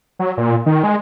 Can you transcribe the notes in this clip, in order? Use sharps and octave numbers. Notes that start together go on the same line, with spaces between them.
F#3
A#2
D#3
G#3